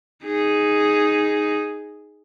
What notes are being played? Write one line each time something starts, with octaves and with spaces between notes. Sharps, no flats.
D#4 G#4